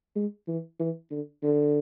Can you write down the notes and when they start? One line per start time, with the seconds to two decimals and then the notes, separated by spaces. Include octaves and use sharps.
0.16 G#3
0.48 E3
0.80 E3
1.11 D3
1.43 D3